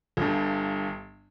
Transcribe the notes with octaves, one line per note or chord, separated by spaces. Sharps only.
G1 G2